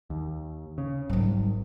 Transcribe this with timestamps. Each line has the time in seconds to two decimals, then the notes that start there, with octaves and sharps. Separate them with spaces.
0.10 D#2
0.78 C#3
1.10 G#1 F#3 G3